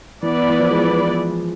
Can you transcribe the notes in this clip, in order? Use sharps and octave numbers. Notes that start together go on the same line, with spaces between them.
E3 B3 E4 B4 D5
E3
F3
G#3
F3